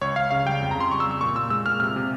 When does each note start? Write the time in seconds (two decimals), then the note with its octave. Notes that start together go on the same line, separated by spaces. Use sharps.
0.01 C#2 C#5
0.16 C#2 F5
0.31 C#3 F5
0.46 G3 G5
0.61 F2
0.71 A#5
0.75 C#3
0.80 C6
0.91 G3 C#6
1.00 E6
1.06 G3
1.11 E6
1.21 A#2 C#6
1.35 A#2 E6
1.50 G#3 E6
1.66 A#2 F6
1.80 C3 F6
1.96 C3